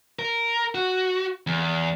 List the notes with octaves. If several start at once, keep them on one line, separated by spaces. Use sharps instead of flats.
A#4
F#4
E2